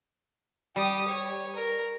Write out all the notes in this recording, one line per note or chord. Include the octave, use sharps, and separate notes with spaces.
G3 G4 D#6
C#5
A#4